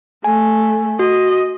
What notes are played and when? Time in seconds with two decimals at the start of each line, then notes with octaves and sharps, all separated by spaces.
0.24 A3 G#5
0.99 F#4 D#5